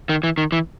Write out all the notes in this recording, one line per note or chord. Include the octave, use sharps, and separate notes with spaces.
D#3
E3
D#3
E3